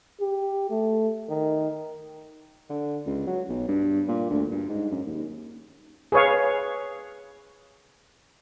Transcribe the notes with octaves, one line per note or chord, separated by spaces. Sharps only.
G4
A3
D#3
D3
C#2
F#3
B1
G2
A#2
D2
G2
G#2
F#2
D#2
G#4 B4 C#5 F5